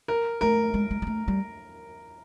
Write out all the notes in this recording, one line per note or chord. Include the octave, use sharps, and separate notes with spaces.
A#4
A3 A#4
G#3
G#3
G#3
A3
G3